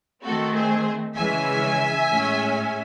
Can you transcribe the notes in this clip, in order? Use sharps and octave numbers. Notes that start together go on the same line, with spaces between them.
D#3 A3 C4 F#4 A4
G#4 C5
C#3 E3 G#3 C#4 E5 G#5
A2 G#3 C#4